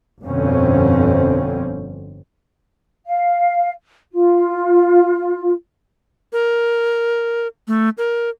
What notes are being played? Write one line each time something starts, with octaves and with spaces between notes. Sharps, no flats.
G1 F2 B2 D3 C4 C#4
F5
F4
A#4
A3
A#4